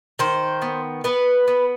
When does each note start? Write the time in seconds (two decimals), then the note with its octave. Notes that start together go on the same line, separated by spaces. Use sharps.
0.19 D#3 C5
0.62 B3
1.04 B3 B4
1.48 B3